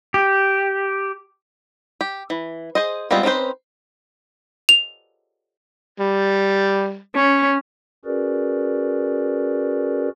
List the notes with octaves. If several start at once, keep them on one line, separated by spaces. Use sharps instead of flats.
G4
G4
E3
G#4 C5 D#5
G3 G#3 B3 C4 F4
C4 C#4 D#4 B4 C5
F7
G3
C#4
C#4 F#4 G#4 A#4 B4 D5